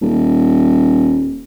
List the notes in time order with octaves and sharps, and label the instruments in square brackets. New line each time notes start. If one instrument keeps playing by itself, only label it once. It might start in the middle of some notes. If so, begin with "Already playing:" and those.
[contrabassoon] D#1